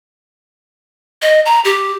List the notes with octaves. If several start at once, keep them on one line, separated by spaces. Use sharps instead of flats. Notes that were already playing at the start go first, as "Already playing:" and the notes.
D#5
A#5
G4